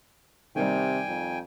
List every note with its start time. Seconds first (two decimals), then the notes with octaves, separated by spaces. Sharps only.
0.56 C3 D#3 G3 G5 G#5
1.08 F2